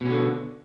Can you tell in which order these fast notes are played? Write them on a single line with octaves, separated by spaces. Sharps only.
B2 C#4 D3